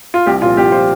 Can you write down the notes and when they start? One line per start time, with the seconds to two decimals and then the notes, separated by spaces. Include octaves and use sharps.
0.14 F4
0.26 C2 G4
0.42 A#2 F3 F4
0.57 C2 G4
0.72 A#2 F3 C5